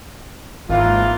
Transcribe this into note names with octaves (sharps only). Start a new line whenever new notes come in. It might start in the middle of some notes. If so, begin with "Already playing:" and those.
G#1 E3 A#3 F4